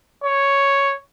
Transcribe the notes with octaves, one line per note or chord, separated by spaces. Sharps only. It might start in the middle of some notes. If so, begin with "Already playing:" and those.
C#5